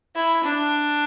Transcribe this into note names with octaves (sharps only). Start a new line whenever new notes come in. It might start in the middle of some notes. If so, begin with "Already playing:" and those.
E4
D4